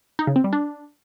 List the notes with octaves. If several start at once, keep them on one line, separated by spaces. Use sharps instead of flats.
D#4
C#3
C4
G3
D4